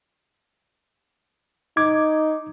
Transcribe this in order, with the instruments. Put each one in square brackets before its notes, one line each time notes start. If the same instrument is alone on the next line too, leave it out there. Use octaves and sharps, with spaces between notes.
[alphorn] D#4 [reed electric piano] D6 G#6